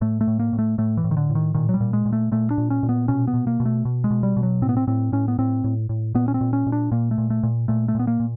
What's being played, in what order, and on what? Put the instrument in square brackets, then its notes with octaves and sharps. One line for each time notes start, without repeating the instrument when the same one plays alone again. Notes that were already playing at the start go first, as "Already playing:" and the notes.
[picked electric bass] A2 A3
A3
A2
A#3
A2
A3
A2 A3
E3
A2
D#3
D3
A2
D#3
A#2 D#3
F#3
G3
A#2
G#3
A#2
A3
A#2 A3
D4
A#2
C#4
A#2
B3
B2 C#4
B3
B2
A#3
B2
A3
B2
G#3
B2
G3
B2
F#3
A2 C4
B3
C4
A2 C4
A2 C#4
B3
A2 C4
A2
A2
A#2 B3
C#4
C4
A#2
C#4
A#2
D4
A#2 A#3
A3
A#2
A3
A#2
A#2 A3
A3
A#2 B3
A#3
A#2